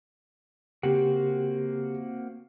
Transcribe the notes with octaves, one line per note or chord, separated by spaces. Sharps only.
C#3 A#3 C4 F#4 G4